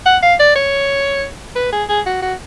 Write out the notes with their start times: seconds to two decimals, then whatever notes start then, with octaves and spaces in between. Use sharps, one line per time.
0.06 F#5
0.23 F5
0.39 D5
0.56 C#5
1.56 B4
1.72 G#4
1.89 G#4
2.06 F#4
2.22 F#4